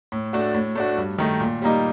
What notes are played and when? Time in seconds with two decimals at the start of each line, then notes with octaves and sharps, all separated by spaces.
0.12 A2
0.33 A3 D4 F#4
0.54 A2
0.75 A3 D4 F#4
0.97 G2
1.18 D#3 A3 D#4
1.40 A#2
1.62 G3 A#3 D#4